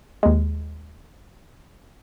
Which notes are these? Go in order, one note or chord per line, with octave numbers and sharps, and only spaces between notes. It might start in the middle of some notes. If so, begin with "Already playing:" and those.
D#2 G#3